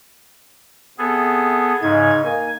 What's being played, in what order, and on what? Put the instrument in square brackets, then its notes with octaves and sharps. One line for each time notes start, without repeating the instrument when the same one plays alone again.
[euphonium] C3 [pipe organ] B3 G#4 A4
[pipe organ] G#2 C#3 G#6 [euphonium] D#4
[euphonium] A#3 [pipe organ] G#5